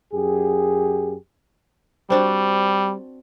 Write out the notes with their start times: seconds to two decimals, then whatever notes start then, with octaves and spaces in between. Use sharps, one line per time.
0.13 F#2 G4 G#4
2.10 G3 C4 D4 F#4